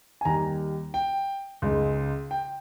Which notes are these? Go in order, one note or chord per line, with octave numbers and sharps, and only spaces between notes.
G#5
D#2 D#3 G3 A#5
G5
C#2 C#3 G#3 D#4
G5